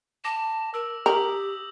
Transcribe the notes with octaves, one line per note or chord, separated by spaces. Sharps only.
A5 D6 A#6
A#4 E6
G4 A#4 D#6 G6 F#7